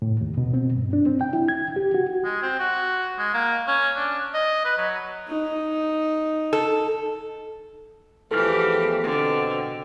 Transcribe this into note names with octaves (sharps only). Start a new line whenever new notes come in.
A2
D#2
B2
C4
G2
D4
C4
G5
E4
G#6
G4
F#4
G#3
C4
F#4
G#3
A#3
C#4
D4
D#5
B4
F#3
D#4
A4
E2 E3 F3 A3 G4 A4 F6
B2 D3 C4